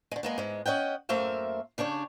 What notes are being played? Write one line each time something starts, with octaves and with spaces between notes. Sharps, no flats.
D3 G#3
G#3 A#3 B3
G#2 G#3
C#4 D#5 F#5 G5
F#2 A3 A#3 C5 E5 F5
C#3 D4 G4 C#5